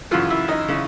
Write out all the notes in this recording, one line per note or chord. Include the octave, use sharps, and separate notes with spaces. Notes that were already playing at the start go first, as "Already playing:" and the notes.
F#2 C#3 E3 F4
E4
D#4
C#3 E3